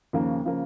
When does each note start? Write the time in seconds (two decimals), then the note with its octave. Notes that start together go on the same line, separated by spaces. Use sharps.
0.13 D#2 C#3 F3 A#3
0.45 C#3 F3 A#3